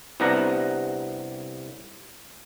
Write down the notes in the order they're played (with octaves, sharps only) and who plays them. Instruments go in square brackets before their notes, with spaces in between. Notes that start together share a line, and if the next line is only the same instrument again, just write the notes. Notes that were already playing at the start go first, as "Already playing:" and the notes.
[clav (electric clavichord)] C2 C3 B3 D4 F#5 A#5